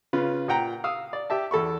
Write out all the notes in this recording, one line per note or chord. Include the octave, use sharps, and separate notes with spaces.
C#3 F4 B4
A#2 F#5 G5 A#5
F5 D#6 E6
D5
G4 E5 A5
E2 A4 B5 C#6